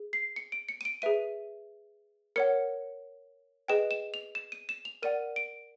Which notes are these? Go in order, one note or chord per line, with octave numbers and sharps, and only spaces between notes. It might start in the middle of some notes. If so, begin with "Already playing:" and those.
Already playing: G#4
C7
C#7
D7
C#7
D#7
D7
G#4 B4 E5 D#7
A#4 C#5 F#5 C#7
G#4 B4 D#5 G5 E7
E7
F7
E7
D#7
E7
F7
A#4 D5 F#5 D#7
D7